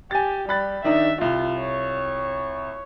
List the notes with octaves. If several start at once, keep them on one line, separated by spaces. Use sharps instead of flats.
G4 G#5 A6
G3 B5 F#6 A6
D#3 D4 D#4 E5
C2 F4
C#5